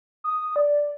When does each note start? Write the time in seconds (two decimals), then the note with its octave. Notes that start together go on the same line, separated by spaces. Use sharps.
0.24 D#6
0.56 D5